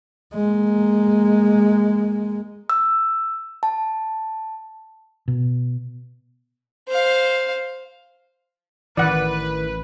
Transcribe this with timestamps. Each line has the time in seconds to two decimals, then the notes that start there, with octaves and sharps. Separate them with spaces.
0.34 G#3 A#3
2.70 E6
3.63 A5
5.28 B2
6.88 C5 F5
8.97 A1 D#3 E3 B4 D5 F#5